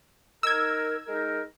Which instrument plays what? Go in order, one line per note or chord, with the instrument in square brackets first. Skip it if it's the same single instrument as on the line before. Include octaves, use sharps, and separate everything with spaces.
[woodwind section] D#4 A#4 [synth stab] E6 G#6
[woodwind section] G#3 D#4 A#4